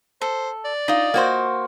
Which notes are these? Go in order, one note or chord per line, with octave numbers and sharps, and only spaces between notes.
A4 C5
D5
D#4 F4 D#5
A#3 F#4 C5